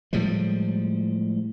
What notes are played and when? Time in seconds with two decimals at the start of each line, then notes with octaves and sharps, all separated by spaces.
0.13 A2 F3 G3 G#3